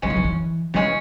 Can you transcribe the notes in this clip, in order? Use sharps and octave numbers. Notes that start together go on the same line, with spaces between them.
C#3 F#3 G#3 C#4
E3
D#3
E3
C#3 E3 G#3 C#4